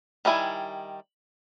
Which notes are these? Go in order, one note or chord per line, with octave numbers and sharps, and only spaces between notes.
D#3 G3 E4 G#5